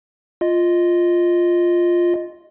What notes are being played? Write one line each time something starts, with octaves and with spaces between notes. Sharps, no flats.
F4 D#5